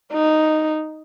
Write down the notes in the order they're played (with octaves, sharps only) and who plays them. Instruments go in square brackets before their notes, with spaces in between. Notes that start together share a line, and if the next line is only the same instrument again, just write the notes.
[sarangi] D#4